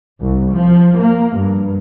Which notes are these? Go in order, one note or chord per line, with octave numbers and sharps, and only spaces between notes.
C2
F3
A#3
G2